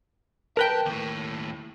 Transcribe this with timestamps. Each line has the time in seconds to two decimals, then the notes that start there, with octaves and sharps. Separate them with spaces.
0.57 B1 A#4 B4 G5 A5
0.86 D#2 A2